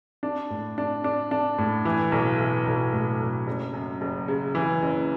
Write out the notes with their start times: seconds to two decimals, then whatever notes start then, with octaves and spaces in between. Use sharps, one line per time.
0.23 D4
0.50 A2
0.78 D4
1.04 D4
1.31 D4
1.58 A2
1.85 E3
2.12 B1
2.39 E3
2.66 B1
2.93 A2
3.20 B1
3.47 F#1
3.74 F#2
4.01 F#1
4.28 C#3
4.55 E3
4.82 F#1